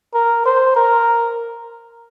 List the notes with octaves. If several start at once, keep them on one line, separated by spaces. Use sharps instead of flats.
A#4
C5
A#4